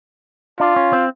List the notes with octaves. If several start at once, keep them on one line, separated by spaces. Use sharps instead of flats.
D4 F4
C#4
C4